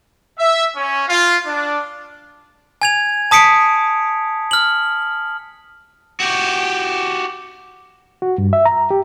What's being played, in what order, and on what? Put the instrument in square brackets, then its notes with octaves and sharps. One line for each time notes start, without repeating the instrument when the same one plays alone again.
[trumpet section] E5
C#4
F4
D4
[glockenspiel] G#5 G#6 F7
A5 D#6 B6 C#7 D7
F6 F#7
[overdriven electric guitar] F#4 G4
[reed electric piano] F#4
G2
E5
A#5
G4